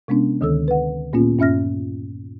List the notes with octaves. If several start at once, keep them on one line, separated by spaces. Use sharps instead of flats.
C3 G#3 B3 C#4 D4
D2 D3 D#3 A4 E6
B4 F#5
A#2 A#3 B3 C#4 F4
G2 C#4 E5 F6 A#6